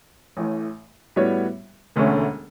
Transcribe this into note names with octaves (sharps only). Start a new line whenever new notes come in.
A1 A2 E3
A2 G3 B3 F#4 C#5
E1 D2 D3 A3 C#4